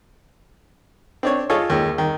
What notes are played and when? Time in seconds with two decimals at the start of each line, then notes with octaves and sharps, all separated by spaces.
1.23 C4 D4 C#5
1.50 F4 G#4 A4 C#5 D#5
1.70 D#2 G#3
1.98 D#3